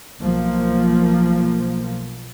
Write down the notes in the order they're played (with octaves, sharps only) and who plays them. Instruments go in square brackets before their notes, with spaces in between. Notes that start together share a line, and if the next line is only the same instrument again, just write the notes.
[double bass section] B1 F3 A#3